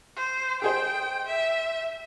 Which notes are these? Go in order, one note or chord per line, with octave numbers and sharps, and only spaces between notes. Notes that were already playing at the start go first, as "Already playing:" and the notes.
C5
G4 G#4 C5 G5
E5